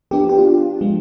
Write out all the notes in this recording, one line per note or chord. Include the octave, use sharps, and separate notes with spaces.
F3 B3 D4 G4
G4
F4
F3 G#3 B3